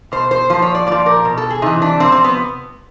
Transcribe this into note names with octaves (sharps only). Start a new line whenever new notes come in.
B2 C5
C5
A#2 F3 C5
C#5
D5
A#2 F3 D5
A#4
B2
A4
G#4
C3 E3 D#4
D4
C3 F3 C4
C4
B3